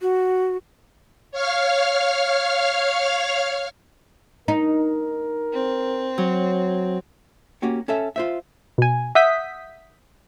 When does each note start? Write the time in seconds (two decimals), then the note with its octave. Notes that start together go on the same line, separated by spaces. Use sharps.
0.01 F#4
1.32 C#5 F5 F6
4.48 D#4 A#4
5.53 C4
6.18 F#3
7.62 A#3 C#4 F#4 G4
7.88 C#4 A4 E5
8.16 F4 C5 E5
8.78 B2 G#5
9.15 E5 F#5 D#6 G6 B6